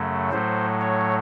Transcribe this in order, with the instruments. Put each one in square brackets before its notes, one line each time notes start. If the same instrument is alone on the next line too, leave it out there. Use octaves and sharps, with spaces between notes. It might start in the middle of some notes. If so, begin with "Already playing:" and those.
Already playing: [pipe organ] F#2 C#3 F#3 A3
A2 F#3 A3 C5
C#5